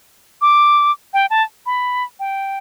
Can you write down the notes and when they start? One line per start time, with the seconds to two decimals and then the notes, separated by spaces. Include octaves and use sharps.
0.42 D6
1.14 G5
1.30 A5
1.66 B5
2.20 G5